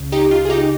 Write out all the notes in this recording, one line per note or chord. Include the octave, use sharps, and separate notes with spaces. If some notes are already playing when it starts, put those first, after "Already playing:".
Already playing: C#2 C#3
D#4 G4
F4
G#4
D#4 G4